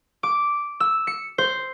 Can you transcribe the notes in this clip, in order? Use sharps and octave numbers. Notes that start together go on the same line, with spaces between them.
D6
E6
C#7
C5